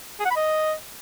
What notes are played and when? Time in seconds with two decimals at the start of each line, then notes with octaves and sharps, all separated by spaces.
0.20 G#4
0.25 F#5
0.31 B5
0.36 D#5